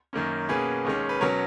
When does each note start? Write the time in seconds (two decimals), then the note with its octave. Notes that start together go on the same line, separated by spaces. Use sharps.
0.13 F#2 D#3 A#3 C#4
0.49 B2 A#3 C#4 G#4 B4
0.85 D#2 D#3 G#3 C#4
1.09 B4
1.21 B2 F#3 C#4 A#4 C#5